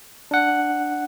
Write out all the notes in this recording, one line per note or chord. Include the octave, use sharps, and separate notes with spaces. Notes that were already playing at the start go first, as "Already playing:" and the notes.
D4 F#5